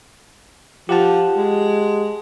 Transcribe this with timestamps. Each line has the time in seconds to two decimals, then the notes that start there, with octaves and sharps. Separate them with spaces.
0.89 F3 G4 F#5 A5
1.36 G#3